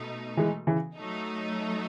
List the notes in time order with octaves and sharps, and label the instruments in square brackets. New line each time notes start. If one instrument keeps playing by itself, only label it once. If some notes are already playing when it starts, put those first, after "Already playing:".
Already playing: [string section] B2 A3 D#4
[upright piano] E3 G#3
C#3 E3
[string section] F#3 A3 D#4